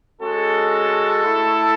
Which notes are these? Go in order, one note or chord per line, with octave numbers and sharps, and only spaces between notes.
G#3 C#4 F#4 A4
A3 E4